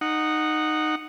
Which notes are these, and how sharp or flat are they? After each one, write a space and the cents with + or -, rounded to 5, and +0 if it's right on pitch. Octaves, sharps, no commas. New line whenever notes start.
D#4 -10 F#5 +0